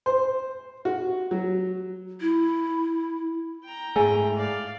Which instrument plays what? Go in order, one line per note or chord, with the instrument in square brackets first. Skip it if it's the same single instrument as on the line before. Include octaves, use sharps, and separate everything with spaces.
[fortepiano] C5
F#4
F#3
[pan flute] E4
[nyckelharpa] G5 A#5
[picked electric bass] G#2 A3 [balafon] G#4 [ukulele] G#5
[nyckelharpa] D5 F5